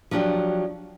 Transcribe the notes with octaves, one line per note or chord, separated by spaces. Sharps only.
F3 F#3 D4 G4